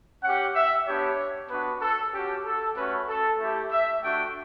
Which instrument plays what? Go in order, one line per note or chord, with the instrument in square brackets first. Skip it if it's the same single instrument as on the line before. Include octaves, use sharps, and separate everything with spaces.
[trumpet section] C#4 G4 F#5
E5
B3 D4 G4 C#5
B3 D4 F#4 B4
A4
C#4 F#4 G4
A4
A3 C#4 F#4 B4
A4
A3 E4 G4 A4
E5
A3 D4 F#4 G5